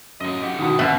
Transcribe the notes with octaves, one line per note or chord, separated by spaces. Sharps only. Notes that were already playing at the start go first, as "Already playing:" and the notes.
F#2 D3 D#5
G4 F#5
B2 D3 D#3 B3
A1 B2 D3 E5 F#5